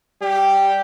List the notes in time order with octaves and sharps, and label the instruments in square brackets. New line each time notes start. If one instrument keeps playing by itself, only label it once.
[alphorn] G3 [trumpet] G4